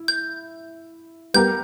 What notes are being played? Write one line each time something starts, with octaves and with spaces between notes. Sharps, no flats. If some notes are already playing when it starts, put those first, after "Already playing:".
Already playing: E4
G6
G3 B3 G4 A#4 G6